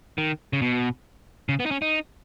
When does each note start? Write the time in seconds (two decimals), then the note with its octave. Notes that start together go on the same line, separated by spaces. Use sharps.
0.18 D#3
0.53 C#3
0.62 B2
1.49 C#3
1.60 B3
1.66 D#4
1.71 C#4
1.82 D#4